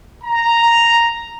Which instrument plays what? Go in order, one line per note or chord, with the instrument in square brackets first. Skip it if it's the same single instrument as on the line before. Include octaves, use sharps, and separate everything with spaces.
[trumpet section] A#5